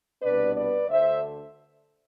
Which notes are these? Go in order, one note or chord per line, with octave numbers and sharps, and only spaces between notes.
C2 B2 B3 D4 B4 D5
B4 D5
D2 D3 A3 C5 E5